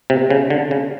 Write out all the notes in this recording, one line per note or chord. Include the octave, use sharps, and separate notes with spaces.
C3
C#3
D3
C#3